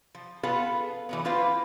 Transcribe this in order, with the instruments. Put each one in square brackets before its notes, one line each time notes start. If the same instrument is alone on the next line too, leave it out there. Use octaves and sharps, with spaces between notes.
[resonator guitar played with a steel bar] F3
B3 F4 G#4 A4 B4 F5
E3 F#3 B3
A#3 E4 F4 B4 C5 F5